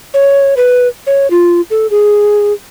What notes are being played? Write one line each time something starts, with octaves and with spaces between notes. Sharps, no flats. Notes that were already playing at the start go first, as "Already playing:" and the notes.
C#5
B4
C#5
F4
A4
G#4